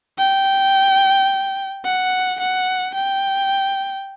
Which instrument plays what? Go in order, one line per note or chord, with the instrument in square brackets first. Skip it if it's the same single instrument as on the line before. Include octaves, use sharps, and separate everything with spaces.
[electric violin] G5
F#5
F#5
G5